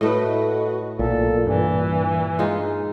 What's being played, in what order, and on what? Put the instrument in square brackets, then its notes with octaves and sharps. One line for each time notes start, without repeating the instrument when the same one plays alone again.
[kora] A2 A3 [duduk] F#4 [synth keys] B4 D#5
[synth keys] B1 [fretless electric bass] A#2 [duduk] A4
[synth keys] G2 [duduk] E3
[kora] G#3 D#4 F4